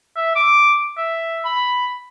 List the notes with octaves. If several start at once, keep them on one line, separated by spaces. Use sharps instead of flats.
E5
D6
E5
B5